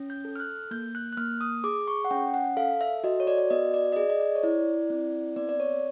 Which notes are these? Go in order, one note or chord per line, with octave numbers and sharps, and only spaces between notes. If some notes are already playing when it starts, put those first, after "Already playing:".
Already playing: C#4
G6
A4
F6
F#6
A#3 G6
F#6
F#6
A#3 F6
D#6
G#4 D6
C#6
F#5
C#4 G5
F#5
A4 F5
E5
F#4 D#5
C#5
D5
D5
B3 D#5
D5
D#5
G#4 D5
D#5
D5
C#5
E4 D5
C4
B3 D5
D5
C#5